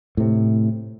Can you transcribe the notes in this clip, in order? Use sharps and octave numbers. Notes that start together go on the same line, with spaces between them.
A2 C3